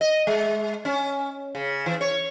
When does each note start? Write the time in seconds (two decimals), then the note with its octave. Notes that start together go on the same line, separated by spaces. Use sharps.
0.01 D#5
0.27 G#3
0.85 C#4
1.55 C#3
1.86 E3
2.01 C#5